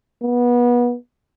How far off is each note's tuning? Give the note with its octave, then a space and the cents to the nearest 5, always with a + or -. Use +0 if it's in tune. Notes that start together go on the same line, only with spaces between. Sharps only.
B3 -25